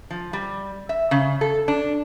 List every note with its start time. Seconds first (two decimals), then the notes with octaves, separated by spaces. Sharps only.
0.10 F3
0.33 G3
0.89 E5
1.11 C#3
1.41 A4
1.68 D4